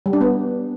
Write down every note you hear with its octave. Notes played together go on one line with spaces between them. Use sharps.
G3
D4
B3